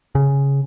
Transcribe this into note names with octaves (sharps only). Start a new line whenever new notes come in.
C#3